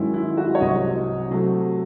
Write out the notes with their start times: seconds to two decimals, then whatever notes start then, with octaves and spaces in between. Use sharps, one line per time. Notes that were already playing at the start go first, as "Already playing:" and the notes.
Already playing: G#2 D#3 F#3 C#4 E4
0.14 E4
0.30 E4
0.37 F#4
0.55 C#5
0.60 C2 C3 F#3 C4 D#5
1.31 C3 F#3 A3 C4